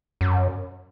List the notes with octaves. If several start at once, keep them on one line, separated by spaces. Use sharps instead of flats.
F#2